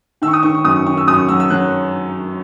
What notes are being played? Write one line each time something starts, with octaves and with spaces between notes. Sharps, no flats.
D#3 E6
C#6
D#6
D#3 C#6
C#6
F#2 D#6
C#6
D#3 C#6
E6
F#2 D#6
C#6
F#3 E6
E6
F#3 F#6